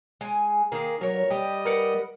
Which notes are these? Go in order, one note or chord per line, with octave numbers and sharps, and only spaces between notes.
G#3 G#5
D#3 A#3 G#4
F#3 A#4 C#5
G3 G4 D#5
A#4 B4 F#5